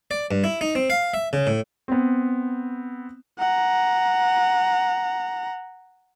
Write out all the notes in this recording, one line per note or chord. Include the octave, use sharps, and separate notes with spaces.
D5
G2
E4
D#4
C4
F5
E5
C#3
A2
B3 C4
F#5 A#5